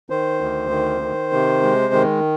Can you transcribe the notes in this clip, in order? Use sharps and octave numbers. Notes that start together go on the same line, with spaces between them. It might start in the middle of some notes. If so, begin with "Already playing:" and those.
D#3 C5
D2
D#3
D#3
C3
G#3
D#3